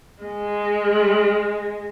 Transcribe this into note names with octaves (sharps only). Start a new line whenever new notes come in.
G#3